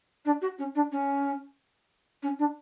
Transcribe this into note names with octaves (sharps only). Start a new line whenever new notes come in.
D4
F#4
C#4
D4
C#4
C#4
D4